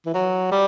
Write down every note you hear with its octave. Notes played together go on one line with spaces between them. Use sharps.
E3
F#3
G3